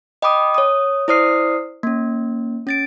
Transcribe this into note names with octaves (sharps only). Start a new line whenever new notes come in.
D#5 G5 B5 D6 D#6
C#5 D#6
E4 C5 D5 D#6 F6 C7
A#3 C#4
C#4 A6 D7